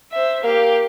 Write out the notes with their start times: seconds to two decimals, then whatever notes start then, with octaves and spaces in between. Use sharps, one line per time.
0.12 C5 E5
0.44 A#3 G4 F5